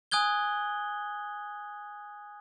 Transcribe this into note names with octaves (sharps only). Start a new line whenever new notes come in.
G#5 D#6 F#6 G#6 G7